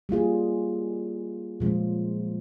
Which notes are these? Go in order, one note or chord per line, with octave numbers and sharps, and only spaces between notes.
G3 A#3 F4 G#4
A#2 F3 G#3 C#4 F4